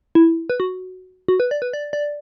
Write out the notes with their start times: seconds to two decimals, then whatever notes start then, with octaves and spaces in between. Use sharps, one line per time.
0.15 E4
0.50 B4
0.60 F#4
1.28 F#4
1.40 B4
1.51 D5
1.62 B4
1.73 D5
1.93 D5